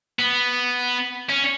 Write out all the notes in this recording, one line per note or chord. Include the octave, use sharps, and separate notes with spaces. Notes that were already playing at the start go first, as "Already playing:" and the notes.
B3
C#4